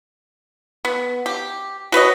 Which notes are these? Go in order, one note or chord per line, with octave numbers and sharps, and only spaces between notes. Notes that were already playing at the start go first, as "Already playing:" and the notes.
B3
G4
F#4 B4 C#5 D#5